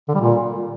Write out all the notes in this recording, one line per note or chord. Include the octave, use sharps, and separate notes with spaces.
D3
G3
A#2